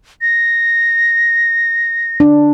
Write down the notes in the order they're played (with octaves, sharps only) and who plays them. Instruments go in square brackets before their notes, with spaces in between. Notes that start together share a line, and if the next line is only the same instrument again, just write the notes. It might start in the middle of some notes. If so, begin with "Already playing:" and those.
[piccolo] A#6
[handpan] D4